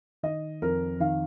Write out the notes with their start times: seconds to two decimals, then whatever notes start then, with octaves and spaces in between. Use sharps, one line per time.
0.23 D#3 D#5
0.62 F2 A#4
1.00 D#3 F5